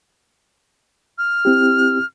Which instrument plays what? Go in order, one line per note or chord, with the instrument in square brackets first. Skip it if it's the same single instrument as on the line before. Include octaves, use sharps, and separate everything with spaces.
[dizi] F6
[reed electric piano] C4 E4 G4